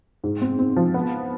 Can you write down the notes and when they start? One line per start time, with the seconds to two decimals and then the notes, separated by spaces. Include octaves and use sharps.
0.24 G#2
0.41 C4
0.59 C4
0.76 F3
0.94 B3